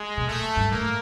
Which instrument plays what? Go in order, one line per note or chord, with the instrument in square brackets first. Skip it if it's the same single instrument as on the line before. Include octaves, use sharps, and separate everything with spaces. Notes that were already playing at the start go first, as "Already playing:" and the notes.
Already playing: [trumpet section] G#3
[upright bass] B2
[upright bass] A#2 [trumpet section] A3
[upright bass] G2
[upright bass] A2 [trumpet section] A#3